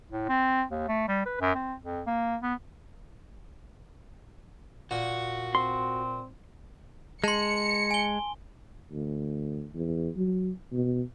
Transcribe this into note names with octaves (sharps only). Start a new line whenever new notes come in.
A2
C4
D#2
A3
G3
B4
F#2
C4
F2
A#3
B3
A#2 F#4
C4 C6
G#3 A5 C6 C#7
G#5 G7
D2
E2
F#3
B2